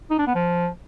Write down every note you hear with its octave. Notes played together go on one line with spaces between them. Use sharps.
D#4
D4
B3
F3